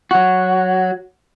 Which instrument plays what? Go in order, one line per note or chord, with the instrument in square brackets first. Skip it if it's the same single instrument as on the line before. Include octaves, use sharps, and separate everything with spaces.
[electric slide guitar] F#3 F#4